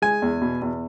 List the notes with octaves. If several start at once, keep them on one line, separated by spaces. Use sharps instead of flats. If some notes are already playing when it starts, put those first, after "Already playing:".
G#3 G#5
E2
B2
E2